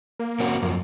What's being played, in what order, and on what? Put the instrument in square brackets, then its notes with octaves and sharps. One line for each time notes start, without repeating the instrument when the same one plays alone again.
[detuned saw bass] A#3
[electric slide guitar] C4 C#4 F#4
F#2 F3